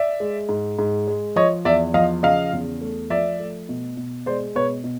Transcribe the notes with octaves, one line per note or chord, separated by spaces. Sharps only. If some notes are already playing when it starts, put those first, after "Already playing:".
Already playing: D5 E5
G#3
G#2
G#2
G#3
F3 C#5 D#5
E2 D5 E5
F3 D#5 F5
C#3 D#5 F5
E2
A3
F3 D5 E5
A3
B2
B2
G#3 C5 D5
B2 B4 C#5
B2